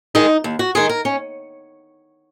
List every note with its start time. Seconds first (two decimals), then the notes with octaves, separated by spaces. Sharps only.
0.15 D#3 G#3 D#4
0.44 D#2
0.59 F#4
0.75 D#3 G#3 G#4
0.89 A#4
1.05 C#4